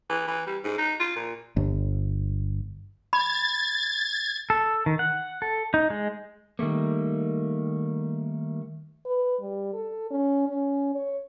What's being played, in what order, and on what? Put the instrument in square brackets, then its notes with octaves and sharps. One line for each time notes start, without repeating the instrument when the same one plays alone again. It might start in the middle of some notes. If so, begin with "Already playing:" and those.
[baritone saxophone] E3
E3
G3
G#2
D#4
F4
A#2
[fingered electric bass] G1
[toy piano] B5 [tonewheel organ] G#6 [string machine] A6
[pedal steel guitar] A4
D#3
F#5
A4
D#4
G#3
[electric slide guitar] D#3 G3 A3 A#3
[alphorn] B4
G3
A4
C#4
C#4
C#5